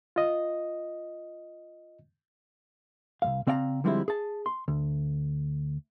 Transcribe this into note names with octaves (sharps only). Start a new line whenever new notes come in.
F4 D#5
C2 F2 F5
C#3 C4 D5 F5 G5 A#5
D3 F3 G3 G#3 C4 E4
G#4 A5
C6
D2